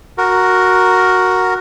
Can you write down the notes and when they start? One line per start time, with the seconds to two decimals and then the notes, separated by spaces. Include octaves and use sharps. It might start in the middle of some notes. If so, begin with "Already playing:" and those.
0.18 F#4 A#4